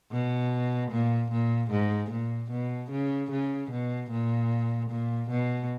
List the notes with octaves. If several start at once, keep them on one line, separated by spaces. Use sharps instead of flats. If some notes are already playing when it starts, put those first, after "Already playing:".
B2
A#2
A#2
G#2
A#2
B2
C#3
C#3
B2
A#2
A#2
B2